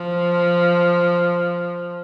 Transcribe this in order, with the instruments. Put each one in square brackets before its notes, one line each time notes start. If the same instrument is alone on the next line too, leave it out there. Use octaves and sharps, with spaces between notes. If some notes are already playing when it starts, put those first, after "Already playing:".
Already playing: [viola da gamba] F3